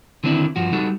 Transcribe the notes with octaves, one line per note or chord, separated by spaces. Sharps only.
D3 D#3 A3 C4 D4 E4
G2 F3 F#4
G3 D#4 F#4 A4